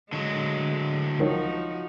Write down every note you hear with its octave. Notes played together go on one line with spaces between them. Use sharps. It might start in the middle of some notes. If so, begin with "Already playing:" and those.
D3 F#3 G#3
C#2 D#3 F3 F#3 D#4 F#4